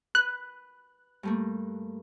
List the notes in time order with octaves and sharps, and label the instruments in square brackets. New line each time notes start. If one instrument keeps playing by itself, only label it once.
[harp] B4 [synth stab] F#6
[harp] G2 A3 A#3